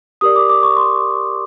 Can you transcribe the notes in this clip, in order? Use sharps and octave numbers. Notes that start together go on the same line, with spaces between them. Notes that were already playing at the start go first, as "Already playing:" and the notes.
G4 A#4 D5 D#6
D6
D6
C#6
C6